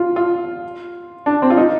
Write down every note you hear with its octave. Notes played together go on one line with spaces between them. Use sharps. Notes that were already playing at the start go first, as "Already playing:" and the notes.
Already playing: F4
F4
D4
C4
F4
D#4